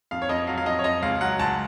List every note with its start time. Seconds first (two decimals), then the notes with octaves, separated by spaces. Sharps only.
0.11 F2 F5
0.22 C#5
0.29 F2 D#5
0.47 F#3 F5
0.58 F5
0.66 F2 D#5
0.79 C#5
0.84 F2 D#5
1.02 C#2 F5
1.21 F#3 F#5
1.39 C#2 A5